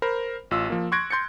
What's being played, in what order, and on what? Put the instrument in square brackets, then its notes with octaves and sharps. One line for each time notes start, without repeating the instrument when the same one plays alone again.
[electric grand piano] A#4 C5 B5
A1 F4 E6
F3 A#3
C6 C#6 F#6 G#6 A#6 D7
C6 G6 A6 C#7